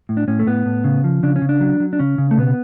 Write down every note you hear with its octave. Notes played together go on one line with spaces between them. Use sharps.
A2
D4
A2 C#4
A3
A2 B3
A2
C#3
F3
C#3 D4
C#4
C#3
D4
F#3
F#3
D4
C#3 C#4
C#3
A3
B2 B3